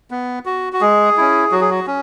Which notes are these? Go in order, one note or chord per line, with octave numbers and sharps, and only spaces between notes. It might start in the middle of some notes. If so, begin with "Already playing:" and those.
B3
F#4
F#4
G#3 G#4
C#4 E4
F#3 F#4
G#4
F#4
C#4